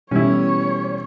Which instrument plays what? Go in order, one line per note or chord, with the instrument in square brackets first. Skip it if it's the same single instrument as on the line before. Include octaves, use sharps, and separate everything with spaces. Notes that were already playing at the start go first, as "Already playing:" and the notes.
[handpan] B2 E3 A3 [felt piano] G3 [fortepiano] C#4 E4 [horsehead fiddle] C#5